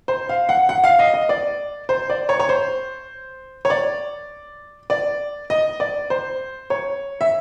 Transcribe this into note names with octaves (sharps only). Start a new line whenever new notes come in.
C5
F5
F#5
F#5
F5
D#5
D#5
D5
C5
D5
C#5
C#5
C5
C#5
D5
D5
D#5
D5
C5
C#5
E5